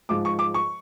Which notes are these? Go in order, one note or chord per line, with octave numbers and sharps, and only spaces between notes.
G#2 F3 D6
C#6
D6
C#6